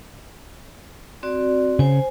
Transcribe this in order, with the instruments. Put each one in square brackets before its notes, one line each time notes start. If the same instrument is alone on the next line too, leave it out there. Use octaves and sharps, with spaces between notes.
[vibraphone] C4 F#4 D5
[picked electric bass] C#3 [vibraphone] C5 G#5